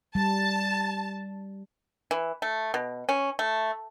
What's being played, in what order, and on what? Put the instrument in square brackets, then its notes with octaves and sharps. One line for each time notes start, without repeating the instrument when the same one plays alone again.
[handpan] G3 [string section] A5
[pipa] E3
A3
B2
C#4
A3